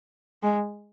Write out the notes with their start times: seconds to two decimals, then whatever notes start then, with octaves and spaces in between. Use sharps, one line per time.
0.43 G#3